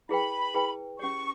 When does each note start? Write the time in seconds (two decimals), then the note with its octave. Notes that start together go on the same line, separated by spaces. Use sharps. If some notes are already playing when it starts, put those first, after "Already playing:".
0.09 E4 G#4 B4 G5 B5
0.54 E4 G#4 B4 G5
0.99 C#4 G4 C#5 C#6